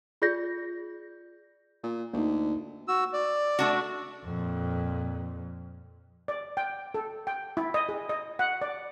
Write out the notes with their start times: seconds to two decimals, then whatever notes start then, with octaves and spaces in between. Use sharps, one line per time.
0.22 F4 G#4 D5 G6 A#6
1.83 A#2
2.13 D2 A#3 D#4
2.88 F#4 E6
3.13 D5
3.59 A3 D4 F#4
4.25 F2 A#2
6.28 D5
6.57 G5
6.94 A4
7.27 G5
7.57 E4
7.74 D#5
7.89 G#4
8.09 D#5
8.39 F#5
8.62 D5